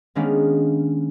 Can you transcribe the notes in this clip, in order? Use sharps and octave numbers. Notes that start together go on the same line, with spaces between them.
D#3 G#3 A#3 B3 C#4 D4